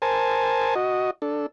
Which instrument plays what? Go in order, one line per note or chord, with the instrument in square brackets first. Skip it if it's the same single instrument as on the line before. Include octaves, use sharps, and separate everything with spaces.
[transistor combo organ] A#4 C5 G#5 A5
F#4 D#5
D4 A4